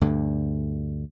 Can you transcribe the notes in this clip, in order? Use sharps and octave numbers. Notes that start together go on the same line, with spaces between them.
D2 G2 D3